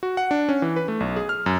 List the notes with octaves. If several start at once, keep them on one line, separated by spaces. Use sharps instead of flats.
F#4
F#5
D4
C#4
E3
B4
A3
B1
G#4
F6
F#2